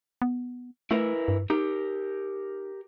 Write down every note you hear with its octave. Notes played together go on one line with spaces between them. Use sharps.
B3
A3 E4 A#4 B4
G2
D#4 G4 A#4